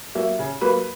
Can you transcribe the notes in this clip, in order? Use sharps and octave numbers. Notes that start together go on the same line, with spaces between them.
F#3 A#3 E5
C#3
F#3 A#3 B4